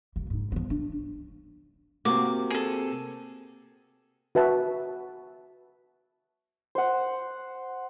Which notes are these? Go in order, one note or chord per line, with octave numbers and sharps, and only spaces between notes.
F#1 A#3
G#2 D#4
F3 B3
D4
C3 A#3 F#4 D6
G#4 A4
F#4 B4 E5 A5
C5 F#5